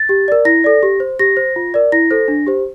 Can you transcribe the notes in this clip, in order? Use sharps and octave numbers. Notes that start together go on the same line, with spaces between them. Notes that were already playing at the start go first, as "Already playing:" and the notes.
Already playing: A6
G4
A#4 D5
E4 A#6
A4 D5
G4
C5
G4 A#6
C5
F4
A#4 D5
E4 A#6
A4 C5
D4
G4 C5